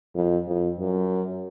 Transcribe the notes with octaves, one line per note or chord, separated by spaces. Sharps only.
F2
F2
F#2